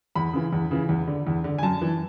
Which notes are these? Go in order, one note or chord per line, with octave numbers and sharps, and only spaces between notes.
E2 B5
C#3 E3
E2
C#3 E3
E2
D3
E2
D3
G#5
F#2 A5
E3